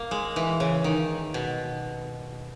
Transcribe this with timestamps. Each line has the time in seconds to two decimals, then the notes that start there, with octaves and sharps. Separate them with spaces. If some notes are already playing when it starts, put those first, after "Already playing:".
Already playing: A#3
0.11 G#3
0.36 E3
0.60 C#3
0.84 D#3
1.34 B2